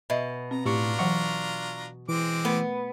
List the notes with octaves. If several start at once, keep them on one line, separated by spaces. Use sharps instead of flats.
B2 D#5 E5
C4 A#5
A2 D4 F4 G4 A#5 C#6
E3 F#3 F#5 C#6
E3 G#3 C4 D6
A3 B3 B4